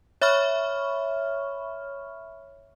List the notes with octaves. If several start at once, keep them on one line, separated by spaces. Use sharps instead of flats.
C#5 E5 B5 C#6 F6